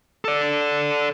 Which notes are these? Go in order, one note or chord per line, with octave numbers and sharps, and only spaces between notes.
A4 D5